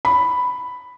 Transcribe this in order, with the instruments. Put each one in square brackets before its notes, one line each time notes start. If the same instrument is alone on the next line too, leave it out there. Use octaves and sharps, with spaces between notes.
[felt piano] B5